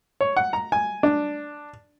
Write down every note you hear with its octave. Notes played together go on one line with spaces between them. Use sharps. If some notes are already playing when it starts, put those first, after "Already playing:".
C#5
F#5
A#5
G#5
D4